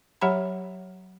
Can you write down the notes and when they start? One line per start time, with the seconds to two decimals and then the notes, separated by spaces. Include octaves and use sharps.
0.21 F#3 G4 C#5 F#5 A#5 B5